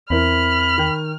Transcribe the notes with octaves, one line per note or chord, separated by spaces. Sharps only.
E2 C4 E4 A#4 B5 F6
D#3 G5